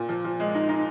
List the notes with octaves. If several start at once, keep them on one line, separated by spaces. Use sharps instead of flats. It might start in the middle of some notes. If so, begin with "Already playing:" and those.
Already playing: A#2
F3
F3
G#3
D#4
D#4